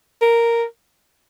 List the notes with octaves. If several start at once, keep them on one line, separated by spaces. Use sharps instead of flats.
A#4